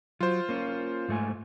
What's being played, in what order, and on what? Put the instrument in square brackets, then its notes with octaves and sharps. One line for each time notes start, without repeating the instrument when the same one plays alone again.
[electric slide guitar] F#3 [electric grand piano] F4 C5
[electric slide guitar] A#3 C#4
G#2 A3 G#5